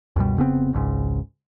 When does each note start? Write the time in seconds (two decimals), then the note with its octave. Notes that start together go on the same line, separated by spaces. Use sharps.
0.16 C#2 F#2 B2 G3
0.37 F1 C#3 B3 C4
0.73 G#1 C#2 G#2 C#3